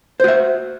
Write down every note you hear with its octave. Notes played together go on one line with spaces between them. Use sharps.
F#4 C5 E5